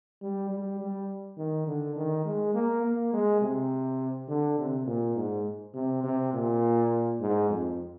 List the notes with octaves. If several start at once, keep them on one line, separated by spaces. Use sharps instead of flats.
G3
G3
G3
D#3
D3
D#3
G#3
A#3
A#3
G#3
C3
D3
C3
A#2
G#2
C3
C3
A#2
G#2
F2